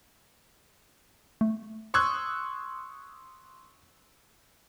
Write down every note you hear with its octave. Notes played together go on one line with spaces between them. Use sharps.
A3
C6 C#6 D#6 E6 F#6 G#6